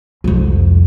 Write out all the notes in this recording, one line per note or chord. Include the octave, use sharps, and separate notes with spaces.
C2 F2